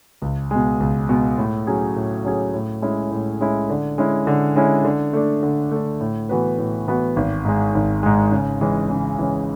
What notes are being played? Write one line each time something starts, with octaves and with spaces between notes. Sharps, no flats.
C#2
B2 G#3
C#2
B2 G#3
A2
F#3 C#4 G#4
A2
F#3 C#4 G#4
A2
G#3 C#4 E4
A2
G#3 C#4 E4
D3
G#3 C#4 E4
D3
G#3 C#4 E4
D3
A3 D4
D3
A3 D4
A2
E3 B3 F#4 B4
A2
E3 B3 F#4 B4
G#1
G#2 G#3
G#1
G#2 G#3
C#3
E3 G#3 C#4
C#3
E3 G#3 C#4